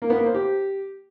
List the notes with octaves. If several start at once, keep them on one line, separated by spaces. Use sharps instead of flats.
A#3
B3
A#3
C5
G4